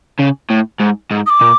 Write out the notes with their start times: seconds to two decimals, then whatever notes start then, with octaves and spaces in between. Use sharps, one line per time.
0.20 C#3
0.50 A2
0.80 G#2
1.11 G#2
1.26 D#6
1.30 D6
1.42 A#2